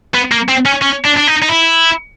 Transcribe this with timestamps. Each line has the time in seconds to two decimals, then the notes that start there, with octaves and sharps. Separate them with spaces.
0.14 B3
0.32 A#3
0.48 C4
0.65 C#4
0.82 C#4
1.04 D4
1.17 D4
1.27 D#4
1.42 D#4
1.49 E4